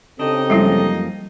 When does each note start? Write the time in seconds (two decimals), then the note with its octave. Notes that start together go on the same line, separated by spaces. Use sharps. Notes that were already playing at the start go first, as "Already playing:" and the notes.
0.19 C#3 C4 D4 D#4 G4 A4 D#5
0.50 F#2 F3 G3 G#3 A#3 E4